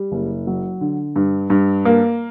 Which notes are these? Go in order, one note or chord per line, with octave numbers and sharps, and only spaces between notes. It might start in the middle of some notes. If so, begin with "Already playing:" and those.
Already playing: G3
F#1
F#3
D3
G2
G2
A#3